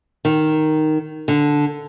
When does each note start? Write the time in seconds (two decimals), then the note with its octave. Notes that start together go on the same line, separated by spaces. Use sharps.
0.25 D#3
1.28 D3